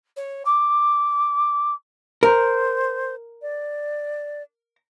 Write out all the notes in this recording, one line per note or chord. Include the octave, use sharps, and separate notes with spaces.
C#5
D6
A#4 C5
D5